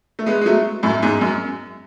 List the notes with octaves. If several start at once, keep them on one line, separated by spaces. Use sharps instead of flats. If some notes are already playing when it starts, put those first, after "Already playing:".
A3
G#3 B3
G#3
F#3 A3
F#2 A2
E2 G#2
F#2